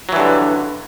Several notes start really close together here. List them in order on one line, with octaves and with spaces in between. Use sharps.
F#3 E3 G2 D3